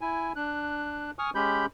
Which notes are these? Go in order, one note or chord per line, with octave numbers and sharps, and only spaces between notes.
E4 G#5
D4 F#6
G#5 C#6 D#6 F6
G#3 C#4 G4 B5 G6